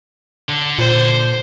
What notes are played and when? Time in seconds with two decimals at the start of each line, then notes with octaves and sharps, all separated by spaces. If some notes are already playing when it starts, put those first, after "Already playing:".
0.49 D3
0.79 A#2 C5